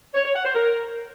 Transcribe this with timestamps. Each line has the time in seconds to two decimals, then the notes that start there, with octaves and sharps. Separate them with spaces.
0.14 C#5
0.24 C#5
0.34 F#5
0.44 C5
0.54 A#4